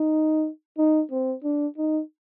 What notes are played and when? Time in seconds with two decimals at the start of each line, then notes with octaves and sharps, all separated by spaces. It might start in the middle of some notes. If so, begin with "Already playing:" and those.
Already playing: D#4
0.78 D#4
1.11 C4
1.44 D4
1.78 D#4